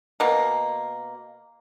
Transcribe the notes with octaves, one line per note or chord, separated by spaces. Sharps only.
B2 A#3